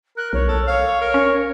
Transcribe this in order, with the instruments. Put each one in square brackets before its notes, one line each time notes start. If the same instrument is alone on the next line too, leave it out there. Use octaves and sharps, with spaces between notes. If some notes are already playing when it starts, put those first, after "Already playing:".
[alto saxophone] A#4 [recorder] F#6
[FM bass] B1 [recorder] C#5
[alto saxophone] A4
[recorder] C#5 [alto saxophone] F5
[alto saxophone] A#4
[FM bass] C#4